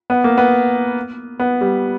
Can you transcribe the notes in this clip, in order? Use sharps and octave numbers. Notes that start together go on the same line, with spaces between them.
B3
A#3
B3
B3
G3